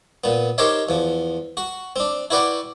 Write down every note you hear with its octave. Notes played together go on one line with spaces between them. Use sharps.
A#2 B3
D#4 G4 A#4 C5 C#5 E5
E2 F3
F#4
C4 D4
E4 F#4 B4 D5 F#5 G5